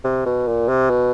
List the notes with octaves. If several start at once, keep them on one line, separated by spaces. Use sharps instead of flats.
C3
B2
A#2
C3
B2